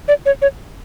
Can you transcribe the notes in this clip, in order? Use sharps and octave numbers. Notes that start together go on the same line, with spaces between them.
D5
C#5
C#5